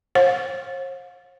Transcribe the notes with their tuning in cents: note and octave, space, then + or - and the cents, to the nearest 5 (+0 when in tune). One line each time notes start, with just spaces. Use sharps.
C5 +45 F5 +40